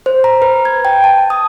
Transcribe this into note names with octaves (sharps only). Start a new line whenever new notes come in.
C5
A#5
B4
G#6
G5
A5
D#6